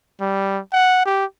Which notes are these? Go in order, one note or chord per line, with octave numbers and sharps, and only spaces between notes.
G3
F#5
G4